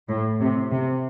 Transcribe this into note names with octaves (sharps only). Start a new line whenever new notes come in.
A2
C3
C3